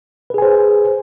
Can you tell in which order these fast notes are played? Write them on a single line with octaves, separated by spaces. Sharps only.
B4 G#4 G#5 C5